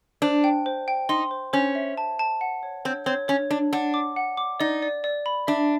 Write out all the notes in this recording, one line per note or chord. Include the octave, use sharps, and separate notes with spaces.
D4 C5
G5
C5
G5
D#4 C6
C5
C#4 C5
E5
A5
A5
F#5
C#5
C4 C#5
C4 C#5
C#4 C#5
D4 C#5
D4 F#5
D6
F#5
D6
D#4 D5
D5
D5
B5
D4 E5